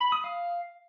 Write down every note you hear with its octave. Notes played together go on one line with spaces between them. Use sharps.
B5
D#6
F5